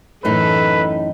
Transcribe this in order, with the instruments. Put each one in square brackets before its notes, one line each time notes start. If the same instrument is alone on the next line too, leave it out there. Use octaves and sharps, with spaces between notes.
[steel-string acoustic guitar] F#2 A2 D#4 [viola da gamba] E3 A4 [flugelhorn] B4